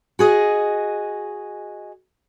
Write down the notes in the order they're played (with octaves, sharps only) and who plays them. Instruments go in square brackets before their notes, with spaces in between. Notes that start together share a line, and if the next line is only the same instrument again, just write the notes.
[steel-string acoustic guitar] F#4 G#4 D#5